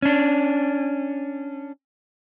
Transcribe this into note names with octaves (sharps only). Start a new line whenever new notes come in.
C#4 D4